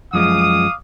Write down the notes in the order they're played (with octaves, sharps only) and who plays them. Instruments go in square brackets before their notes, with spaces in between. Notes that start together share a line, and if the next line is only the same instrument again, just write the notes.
[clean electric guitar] F#2 F3 G#3 [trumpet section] F5 D6 D#6